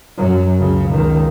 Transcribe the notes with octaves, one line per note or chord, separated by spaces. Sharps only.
F#2 F#3
C#2 C#3
C#2 D#3